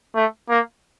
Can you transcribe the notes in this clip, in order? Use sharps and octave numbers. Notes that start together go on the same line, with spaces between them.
A3
A#3